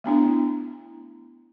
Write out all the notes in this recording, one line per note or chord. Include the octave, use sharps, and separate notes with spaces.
A3 B3 D4 E4